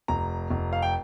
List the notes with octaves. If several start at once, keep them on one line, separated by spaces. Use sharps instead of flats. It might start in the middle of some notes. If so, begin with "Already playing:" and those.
F1 A#5
F1
F5
G5